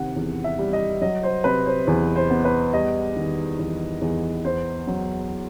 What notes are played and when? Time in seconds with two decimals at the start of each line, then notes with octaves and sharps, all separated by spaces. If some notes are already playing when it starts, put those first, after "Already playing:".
Already playing: C3 D#3 F#5
0.16 E2
0.44 E5
0.59 G3
0.73 D#5
1.01 F#3 D#5
1.23 C5
1.44 C3 B4
1.66 C5
1.87 E2
2.16 C5
2.30 B3
2.45 B4
2.73 G3 D#5
3.16 D#3
3.59 E2
4.01 E2
4.44 B3 C5
4.87 F#3